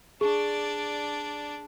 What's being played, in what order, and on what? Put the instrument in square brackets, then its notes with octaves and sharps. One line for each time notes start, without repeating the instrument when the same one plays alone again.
[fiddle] D4 D5 [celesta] G#4